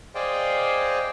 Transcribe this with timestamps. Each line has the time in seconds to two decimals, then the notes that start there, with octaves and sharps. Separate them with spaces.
0.15 G#4 C5 D5 D#5 F5 G5